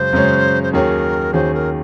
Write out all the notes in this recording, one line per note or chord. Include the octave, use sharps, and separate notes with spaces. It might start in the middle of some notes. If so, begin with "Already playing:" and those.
Already playing: F#2 C#3 G#3 C5
F#2 C#3 G#3 C#4
C5
D#2 D#3 F#3 C#4 G#4 A#4
D#2 D#3 F#3 C#4 G#4 C5
A#4